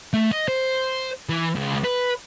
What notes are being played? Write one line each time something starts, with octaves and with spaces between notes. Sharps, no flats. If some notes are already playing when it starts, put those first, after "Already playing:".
A3
D#5
C5
E3
C#2
B4